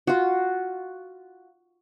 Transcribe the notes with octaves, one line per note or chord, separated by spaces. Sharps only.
F4 F#4